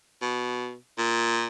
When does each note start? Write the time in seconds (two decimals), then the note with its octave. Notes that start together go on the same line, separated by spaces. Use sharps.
0.21 B2
0.98 A#2